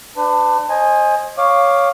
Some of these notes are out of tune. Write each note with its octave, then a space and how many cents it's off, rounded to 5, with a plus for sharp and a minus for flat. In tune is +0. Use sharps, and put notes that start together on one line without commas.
D4 +20 B4 +40
C5 +25 D#5 +0 G#5 +0
C#5 +5 F5 +0 D6 +25